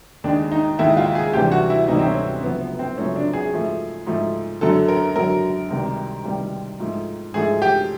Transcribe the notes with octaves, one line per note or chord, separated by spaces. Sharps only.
D#2 D#3 G#3 D4
D#4
D#2 D#3 G#3 E4
F4
G#4
D2 C3 E3 G3 G4
F#4
E4
D2 C3 E3 G3 D#4
C4
C#4
F#2 C#3 F3 A3 B3
B3
C4
F#2 C#3 F3 A3 C#4
D4
G#4
G#2 F3 A3
G#2 F3 A3
F#2 D3 F#3 A4
A#4
F#2 D3 F#3 A#4
C#2 C3 D#3 G3
C#2 C3 D#3 G3
G#2 F3 A3
G#2 F3 A3 G#4
G4